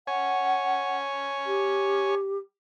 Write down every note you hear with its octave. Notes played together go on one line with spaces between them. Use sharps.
C#5 F#5 G#5
G4